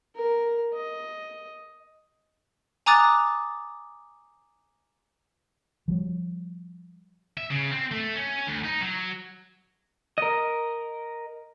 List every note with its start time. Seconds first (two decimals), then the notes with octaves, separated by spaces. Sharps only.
0.15 A#4
0.73 D#5
2.86 G#5 A#5 D6 D#6 F#6 A6
5.88 F3 G3
7.37 E5
7.51 C#3
7.71 C4
7.91 A3
8.15 C#4
8.47 D2
8.64 D#4
8.81 F#3
10.18 A#4 D#5